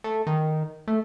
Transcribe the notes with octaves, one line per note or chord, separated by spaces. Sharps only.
A3
D#3
A3